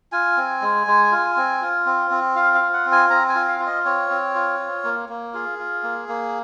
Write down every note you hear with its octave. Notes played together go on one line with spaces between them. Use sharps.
F4 G#5
C4
G#3
G#3
F4
C4
F4
C4
C4
F4 F5
F5
F4
F#5
C4
G#5
C4 A#5
G#5
F4
F5
F4
D#5
C4 C#5
C4
F4
F4
A#3
A#3
F4 G#4
F4
A#3
A#3